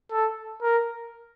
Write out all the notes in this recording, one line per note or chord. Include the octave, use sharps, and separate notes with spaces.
A4
A#4